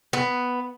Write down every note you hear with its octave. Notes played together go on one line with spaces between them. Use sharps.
B3